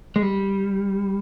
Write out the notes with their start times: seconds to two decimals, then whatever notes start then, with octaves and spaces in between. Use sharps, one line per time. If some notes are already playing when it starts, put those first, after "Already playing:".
0.16 G#3
0.22 G3